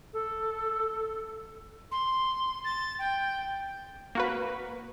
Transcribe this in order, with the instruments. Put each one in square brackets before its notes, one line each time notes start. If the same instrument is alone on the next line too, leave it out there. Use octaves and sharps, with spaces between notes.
[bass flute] A4
[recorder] C6
A6
G5
[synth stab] A#3 F#4 B4